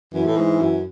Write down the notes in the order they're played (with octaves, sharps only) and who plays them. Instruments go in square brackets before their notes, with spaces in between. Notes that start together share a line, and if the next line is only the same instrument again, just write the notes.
[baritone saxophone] F#2 [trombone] E3
[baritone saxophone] A2
G#2
F#2